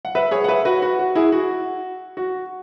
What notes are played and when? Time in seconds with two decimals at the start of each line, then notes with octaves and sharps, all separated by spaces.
0.05 F#5
0.15 B4 E5
0.31 G#4 C#5
0.44 F#5
0.48 B4 E5
0.65 F#4 B4
0.82 F#4
0.99 F#4
1.15 E4 G#4
1.32 F#4
2.17 F#4